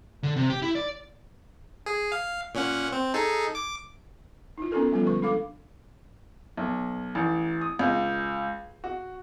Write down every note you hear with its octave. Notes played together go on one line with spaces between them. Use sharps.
D3
C3
G4
E4
D5
G#4
F5
A#2 C#4 F#5
C4
D#4 G#4 A4
D6
D#4 F4
B3 C#4 D#4 F#4 A4 A#4
F3 G3 B3 F4 A4
D3 G#3 C#6
D4 A4 F5 D6
B1
A1
D#6
C#2
F#4